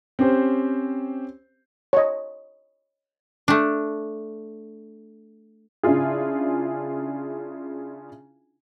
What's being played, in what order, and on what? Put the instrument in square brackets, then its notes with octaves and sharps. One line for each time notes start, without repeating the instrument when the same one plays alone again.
[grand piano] C4 C#4 G4 C5
[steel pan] C#5 D#5
[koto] A3 D4
[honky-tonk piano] C#3 D4 E4 F4 G#4